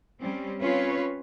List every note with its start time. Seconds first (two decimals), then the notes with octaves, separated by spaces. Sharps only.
0.20 G3 C4 C#4
0.61 C4 C#4 F4 B4 C#5